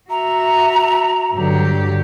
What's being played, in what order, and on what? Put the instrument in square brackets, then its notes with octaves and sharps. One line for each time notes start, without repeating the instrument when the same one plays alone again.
[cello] F#4 E5 [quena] A#5
[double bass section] G2 D3 [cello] F#3 G4